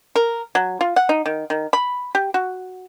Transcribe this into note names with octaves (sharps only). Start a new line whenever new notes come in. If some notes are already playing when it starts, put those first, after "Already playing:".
A#4
F#3
F4
F#5
D#4
D#3
D#3
B5
G4
F#4